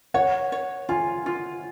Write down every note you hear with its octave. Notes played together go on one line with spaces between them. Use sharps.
C#5 F#5
C#5
F4 G#5
F4